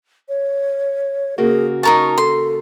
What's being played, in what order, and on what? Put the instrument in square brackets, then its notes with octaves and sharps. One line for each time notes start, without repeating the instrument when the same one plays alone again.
[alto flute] C#5
[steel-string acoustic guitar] C#3 A#3 F#4 [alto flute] G#4
[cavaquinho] D#4 A#4 A5 [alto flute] C#6
[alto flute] A4 [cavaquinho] C6